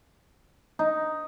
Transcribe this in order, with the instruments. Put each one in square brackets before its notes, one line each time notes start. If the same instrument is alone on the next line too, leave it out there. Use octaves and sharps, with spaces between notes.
[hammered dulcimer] D#4